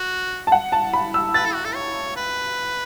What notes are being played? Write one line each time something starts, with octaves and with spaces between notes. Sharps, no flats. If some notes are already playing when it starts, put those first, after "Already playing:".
Already playing: F#4
A5
F#5
A5
B5
E6
B4 A6
A4
F#4
A4
C#5
B4